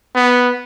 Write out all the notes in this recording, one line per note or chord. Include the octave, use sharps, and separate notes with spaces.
B3